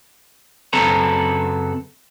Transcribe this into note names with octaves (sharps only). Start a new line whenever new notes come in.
F#2 C#3 C4 A4 B4 A#5